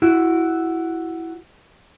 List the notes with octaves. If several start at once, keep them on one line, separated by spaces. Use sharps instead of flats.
E4 F#4